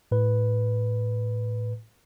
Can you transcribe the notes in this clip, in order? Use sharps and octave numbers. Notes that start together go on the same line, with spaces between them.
A2 B4